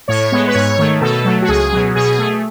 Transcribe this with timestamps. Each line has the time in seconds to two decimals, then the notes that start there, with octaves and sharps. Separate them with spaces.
0.08 A2 C#5
0.32 G#3 B3
0.47 B4
0.55 G#2 C#5
0.78 D#3 A3
1.01 B2 A4
1.25 F#3 A3
1.42 F#4
1.48 C#2 G#4
1.73 B2 F#3
1.95 B2 G#4
2.18 A3